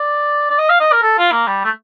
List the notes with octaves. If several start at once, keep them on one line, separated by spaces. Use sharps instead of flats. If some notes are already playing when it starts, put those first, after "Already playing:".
Already playing: D5
D5
D#5
F5
D#5
A#4
A4
F4
A#3
G3
A3